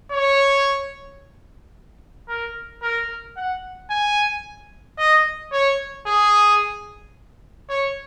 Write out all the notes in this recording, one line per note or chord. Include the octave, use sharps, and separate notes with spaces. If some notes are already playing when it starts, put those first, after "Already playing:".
C#5
A#4
A#4
F#5
G#5
D#5
C#5
G#4
C#5